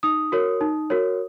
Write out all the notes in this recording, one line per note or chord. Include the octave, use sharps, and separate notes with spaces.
D#4 D#6
F#4 A#4 C#5
D#4
F#4 A#4 C#5